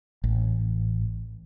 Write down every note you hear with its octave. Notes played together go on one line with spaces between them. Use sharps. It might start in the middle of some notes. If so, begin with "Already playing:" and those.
A1